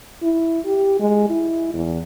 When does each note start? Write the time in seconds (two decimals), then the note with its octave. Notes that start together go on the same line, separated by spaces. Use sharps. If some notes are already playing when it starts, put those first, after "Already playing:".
0.22 E4
0.65 G4
1.00 G#3
1.30 E4
1.74 E2